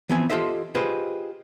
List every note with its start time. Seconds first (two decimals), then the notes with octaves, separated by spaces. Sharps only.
0.09 E3 F3 B3 C4 G#5
0.30 F4 G4 A4 C5 D#5 E5
0.75 F4 G4 G#4 B4 C5 D#5